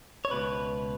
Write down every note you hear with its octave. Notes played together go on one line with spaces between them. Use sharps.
C#5
C#2 B2 B4